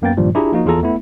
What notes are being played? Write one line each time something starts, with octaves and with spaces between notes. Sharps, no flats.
F#2 A#3 B3 G5 A6
G2 A#2 D#3 F3 G3
D4 E4 F4 G4 G#4 A#5
F3 A#3 D#4 F#4
E2 F4 G#4 A4 A#5
A3 B3 E4